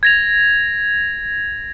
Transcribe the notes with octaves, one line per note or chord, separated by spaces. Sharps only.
G#6 A#6 F7